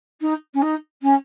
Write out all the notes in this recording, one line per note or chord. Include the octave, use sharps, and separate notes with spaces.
D#4
C#4
D#4
C#4